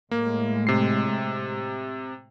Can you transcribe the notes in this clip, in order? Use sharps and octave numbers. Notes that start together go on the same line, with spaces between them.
A2 G#3 A#3
C3 C7